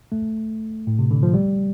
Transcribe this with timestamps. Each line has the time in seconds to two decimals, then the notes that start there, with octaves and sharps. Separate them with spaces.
0.12 A3
0.87 A2
0.99 C3
1.11 D3
1.23 F3
1.34 G3